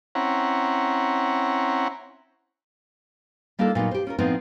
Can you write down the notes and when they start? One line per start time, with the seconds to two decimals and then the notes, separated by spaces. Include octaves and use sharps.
0.15 C4 C#4 E4 F#5 A#5
3.59 G3 A#3 D4 D#4 F4 A4
3.75 A#2 F#3 B3 D#4
3.91 G4 C5
4.07 C#4 F4 A#4
4.19 A2 F3 B3 C4 D#4